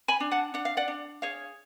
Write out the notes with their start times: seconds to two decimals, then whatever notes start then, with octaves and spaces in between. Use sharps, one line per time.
0.08 G#5 B5
0.20 D4
0.32 F#5 A5
0.54 D4 F#5
0.65 F5
0.77 D5 F#5
0.88 D4
1.22 G#4 C#5 F5